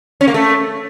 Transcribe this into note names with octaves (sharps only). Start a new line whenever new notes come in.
C#4
A#3
A3